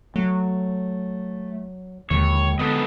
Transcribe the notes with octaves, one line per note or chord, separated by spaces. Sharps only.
F#3 A3
D#2 D3 F3 G#3 C#5
B3 A4 B4 D#5